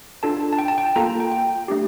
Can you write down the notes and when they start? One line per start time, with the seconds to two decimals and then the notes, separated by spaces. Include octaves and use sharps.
0.23 D4 F4 A4 A5
0.53 A5
0.58 G5
0.68 A5
0.78 G5
0.86 A5
0.96 A#3 F4 A4 A#5
1.20 G5
1.31 G5
1.68 A3 D4 G4